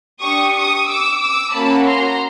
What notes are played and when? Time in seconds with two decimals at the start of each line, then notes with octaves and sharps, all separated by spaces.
0.21 D4 G4 C#6 D#6
0.54 C#6 D#6
0.87 D6 E6
1.21 D6 E6
1.53 A#3 C#4 F#4 A5 B5
1.87 A#5 C6